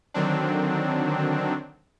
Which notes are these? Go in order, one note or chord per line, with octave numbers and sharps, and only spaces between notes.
D3 D#3 F#3 C4 D4